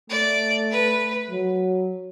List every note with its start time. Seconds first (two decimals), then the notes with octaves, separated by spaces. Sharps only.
0.10 A3 D5
0.71 B4
1.31 F#3